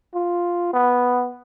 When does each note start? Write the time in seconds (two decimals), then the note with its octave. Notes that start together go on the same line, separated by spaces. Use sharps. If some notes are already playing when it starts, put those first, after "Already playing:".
0.14 F4
0.73 B3